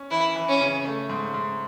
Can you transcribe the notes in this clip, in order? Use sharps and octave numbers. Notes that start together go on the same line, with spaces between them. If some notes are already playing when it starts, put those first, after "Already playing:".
Already playing: C#4
E3 E4
E3
C#4
C#3
A3
G#2
G#2